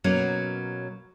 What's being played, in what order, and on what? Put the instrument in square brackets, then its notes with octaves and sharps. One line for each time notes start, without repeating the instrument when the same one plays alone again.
[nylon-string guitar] B2 F#3 A#3 C#4